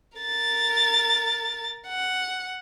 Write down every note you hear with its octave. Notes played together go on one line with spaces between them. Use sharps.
A#4 A6
F#5